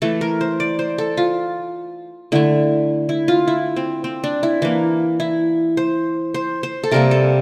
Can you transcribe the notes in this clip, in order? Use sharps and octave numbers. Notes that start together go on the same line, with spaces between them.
E3 A3 A4
A#4
C5
D5
C5
A4
F4
D3 A3 E4
E4
F4
E4
C4
C4
D4
E4
E3 A#3
E4
C5
C5
C5
A4
C3 G3 A#3 A#4
A4